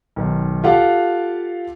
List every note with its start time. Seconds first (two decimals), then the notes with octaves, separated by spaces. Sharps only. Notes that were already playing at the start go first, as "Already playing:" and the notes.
0.16 B1 D#3
0.64 F4 G4 A4 F5 F#5